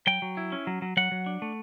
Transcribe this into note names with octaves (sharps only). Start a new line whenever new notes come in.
F#3 G5
F#3
E4
C#4
F#3
F#3
F#3 F#5
F#3
D4
A3